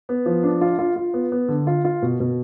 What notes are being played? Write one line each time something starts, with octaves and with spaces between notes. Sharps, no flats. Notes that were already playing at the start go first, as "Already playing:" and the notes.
B3
F3
D4
F4
F4
F4
B3
B3
D3
F4
F4
B2
B2